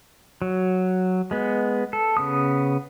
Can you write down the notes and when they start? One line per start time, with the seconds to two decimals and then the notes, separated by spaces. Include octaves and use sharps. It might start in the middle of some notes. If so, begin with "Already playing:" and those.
0.42 F#3
1.31 G#3 B3
1.93 A4
2.17 C#3 B3 D#6